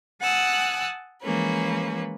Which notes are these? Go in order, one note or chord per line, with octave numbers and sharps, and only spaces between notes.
F#5 G#5 A5 D#6 E6 F#6
E3 F3 G#3 A#3 C#4 B4